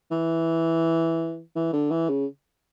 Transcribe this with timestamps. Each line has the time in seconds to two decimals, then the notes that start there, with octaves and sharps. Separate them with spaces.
0.11 E3
1.56 E3
1.73 D3
1.91 E3
2.09 C#3